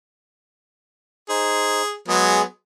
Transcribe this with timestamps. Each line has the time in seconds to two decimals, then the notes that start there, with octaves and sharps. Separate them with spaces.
1.29 D#4 G#4 C5
2.08 F#3 G#3 B3 G#4